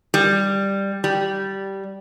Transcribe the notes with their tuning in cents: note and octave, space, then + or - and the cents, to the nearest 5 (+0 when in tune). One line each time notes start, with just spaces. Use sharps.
G3 +5
G3 -10